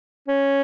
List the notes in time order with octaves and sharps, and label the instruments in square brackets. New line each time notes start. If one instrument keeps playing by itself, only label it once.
[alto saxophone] C#4